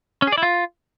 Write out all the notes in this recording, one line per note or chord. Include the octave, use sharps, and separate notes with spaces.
C#4
G#4
D5
E4
F4